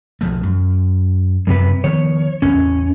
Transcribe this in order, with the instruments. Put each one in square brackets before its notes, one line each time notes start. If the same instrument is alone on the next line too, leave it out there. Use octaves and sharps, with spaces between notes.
[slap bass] B1 F3 A3
F#2
[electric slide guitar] F#2 C3 B4
[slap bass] D#3 F3 B3 [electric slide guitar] C#5
[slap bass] A1 E2 [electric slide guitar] C#4